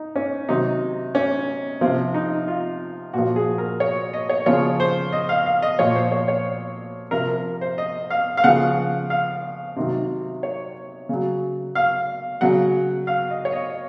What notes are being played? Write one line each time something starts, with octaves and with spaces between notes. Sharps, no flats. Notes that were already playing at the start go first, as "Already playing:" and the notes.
Already playing: D#4
C#4
C3 D#3 F#3 D#4
C#4
C3 F3 C4
D#4
F4
A#2 F3 F#4
G#4
A#4
C#5
D#5
C#5
C#3 F3 C#5
C5
D#5
F5
F5
D#5
A#2 F3 C#5
C5
C#5
C#5
C3 F3 A#4
A#4
C5
D#5
F5
F5
C#3 F3 F#5
F5
C3 D#3 F#3
C#5
C#3 F#3
F5
C#3 F#3 F#5
F5
D#5
C#5
D#5